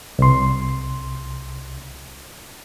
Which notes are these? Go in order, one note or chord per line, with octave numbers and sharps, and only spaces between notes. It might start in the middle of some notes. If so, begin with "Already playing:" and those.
C2 C6